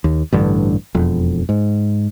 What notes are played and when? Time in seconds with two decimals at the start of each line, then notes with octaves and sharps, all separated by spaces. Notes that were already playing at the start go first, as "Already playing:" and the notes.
0.04 D#2
0.32 A1 G2 D3
0.94 E1 F2
1.49 G#2